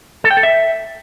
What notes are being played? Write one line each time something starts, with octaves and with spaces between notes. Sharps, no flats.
A4
G5
A4
E5